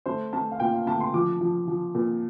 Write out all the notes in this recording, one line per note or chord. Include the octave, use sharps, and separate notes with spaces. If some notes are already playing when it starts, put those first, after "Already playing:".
A3 C5
A3 A5
F5
A#2 G5
F5
A3 A5
C6
F3 D6
F3
F3
A#2